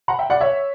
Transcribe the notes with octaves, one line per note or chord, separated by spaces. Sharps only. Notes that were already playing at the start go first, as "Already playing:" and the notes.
F#5 A#5
E5 G5
D5 F#5
C#5 E5